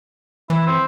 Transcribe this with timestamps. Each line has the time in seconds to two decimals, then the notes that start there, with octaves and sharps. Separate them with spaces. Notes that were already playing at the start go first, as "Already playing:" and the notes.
0.50 E3 E4
0.67 C4